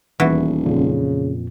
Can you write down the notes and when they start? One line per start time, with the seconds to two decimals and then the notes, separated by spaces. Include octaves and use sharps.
0.20 D#1 E2 E3 F#4
0.65 F2 A#2 C#3